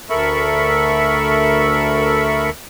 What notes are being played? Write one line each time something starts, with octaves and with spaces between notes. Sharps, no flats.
D2 A4 A#4 E5 B5 C#6